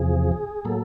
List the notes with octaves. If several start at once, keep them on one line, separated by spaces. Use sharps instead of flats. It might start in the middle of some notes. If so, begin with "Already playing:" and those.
Already playing: E2 C3 F3 G#4
A2 F#3 A#3 A4